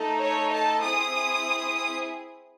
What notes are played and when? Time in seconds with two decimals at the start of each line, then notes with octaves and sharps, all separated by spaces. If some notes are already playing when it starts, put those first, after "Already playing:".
Already playing: A3 D#4 A4
0.22 C#5
0.53 A5
0.84 C4 E4 G#4 D#6